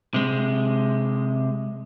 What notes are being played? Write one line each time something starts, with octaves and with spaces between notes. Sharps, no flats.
C3 G#3